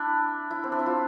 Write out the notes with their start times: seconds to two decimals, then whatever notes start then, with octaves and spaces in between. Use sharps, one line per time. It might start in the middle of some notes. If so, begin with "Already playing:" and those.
Already playing: D4 E4
0.51 E4
0.64 C4
0.72 D4
0.79 E4
0.86 F4